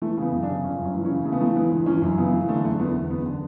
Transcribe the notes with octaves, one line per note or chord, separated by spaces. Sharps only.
E3 A3
C#3 B3
F#2
D4
C#3
G1 C#4
F#2
C#4
E3
C#4
C#3
C#3 A3
B3
E3 A3
E3 B3
G1
E3 C#4
F#2
C#3 B3
E3
D3 A3
F#1 A3
E2 B3
D3
F#1 B3
D3